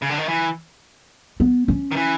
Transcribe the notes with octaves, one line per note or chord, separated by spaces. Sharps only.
C#3
D3
D#3
E3
B3
C#4
D#3
E3